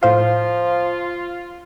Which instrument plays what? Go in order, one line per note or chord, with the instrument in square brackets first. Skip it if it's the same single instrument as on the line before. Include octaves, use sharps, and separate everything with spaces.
[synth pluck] A2 C5 F5 [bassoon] F3 [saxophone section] F4